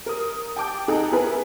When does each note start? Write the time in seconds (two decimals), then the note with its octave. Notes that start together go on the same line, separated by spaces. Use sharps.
0.06 A#4 D#6
0.56 G5 A5 D6 G6
0.88 D#4 G#4 A4 G5 A#5 F#6
1.12 B3 E4 G#4 A#4 B4